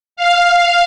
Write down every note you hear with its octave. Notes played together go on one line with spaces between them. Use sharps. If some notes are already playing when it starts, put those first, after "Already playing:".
F5